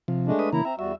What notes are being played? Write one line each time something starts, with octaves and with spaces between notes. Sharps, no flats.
C3 F3
G#3 A3 D4
B4 D#6
C#3 E3 A#3 E4 A#5
C4 E5 A#5
E2 G3 F#4 E5